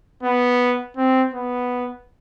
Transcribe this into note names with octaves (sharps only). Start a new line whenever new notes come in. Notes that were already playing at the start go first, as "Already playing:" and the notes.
B3
C4
B3